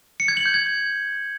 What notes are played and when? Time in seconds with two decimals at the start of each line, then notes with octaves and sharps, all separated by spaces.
0.20 C#7
0.28 G#6
0.37 F#7
0.46 G6
0.54 G#6